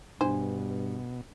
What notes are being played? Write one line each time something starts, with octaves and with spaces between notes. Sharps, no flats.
G2 B2 D4 C5